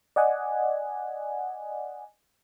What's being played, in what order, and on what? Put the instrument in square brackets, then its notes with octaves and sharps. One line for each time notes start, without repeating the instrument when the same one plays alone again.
[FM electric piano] D5 D#5 F#5 G#5